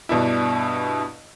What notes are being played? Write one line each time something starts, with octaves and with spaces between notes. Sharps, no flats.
G2 B2 D4 E4